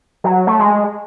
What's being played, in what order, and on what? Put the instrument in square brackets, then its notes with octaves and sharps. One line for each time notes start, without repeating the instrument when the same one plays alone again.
[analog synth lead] F#3
A3
G#3